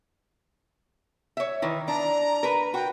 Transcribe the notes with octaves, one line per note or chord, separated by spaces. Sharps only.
C#5 E5
D#3 E3
D4 A#5
A#4 B4
F#4 G5